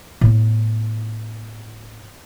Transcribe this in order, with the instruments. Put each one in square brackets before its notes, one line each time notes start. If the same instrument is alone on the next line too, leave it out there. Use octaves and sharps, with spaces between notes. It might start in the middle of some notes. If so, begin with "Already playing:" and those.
[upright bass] A2 B3